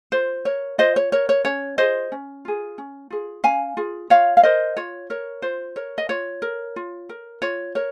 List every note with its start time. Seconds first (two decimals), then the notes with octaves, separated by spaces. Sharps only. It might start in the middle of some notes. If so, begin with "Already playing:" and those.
0.12 F4 C5
0.45 A#4 C#5
0.78 F4 C5 D#5
0.96 C#5
1.12 A#4 C#5
1.29 C#5
1.45 C#4 C#5
1.78 F4 G#4 C5 D#5
2.12 C#4
2.45 F4 G#4
2.78 C#4
3.10 F4 G#4
3.44 C#4 F5 G#5
3.77 F4 G#4
4.10 F4 C#5 F5
4.37 F5
4.43 A#4 C5 D#5
4.77 F4 C#5
5.10 A#4 C#5
5.42 F4 C5
5.76 A#4 C#5
5.98 D#5
6.09 F4 C#5
6.42 A#4
6.76 F4
7.09 A#4
7.42 F4 C#5
7.75 A#4 C#5